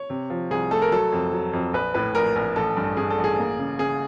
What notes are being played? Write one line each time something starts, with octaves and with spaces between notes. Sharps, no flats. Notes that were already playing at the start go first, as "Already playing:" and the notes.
Already playing: C#5
C3
F3
C2 G#4
A3 A4
A#4
F#3 A4
F2
F#3
F2
A#1 B4
A2 B4
A#1 A#4
A#1 A#4
A1 A4
G2
G2 G#4
A4
A1
G#4
A#3
C#3
C#3 G#4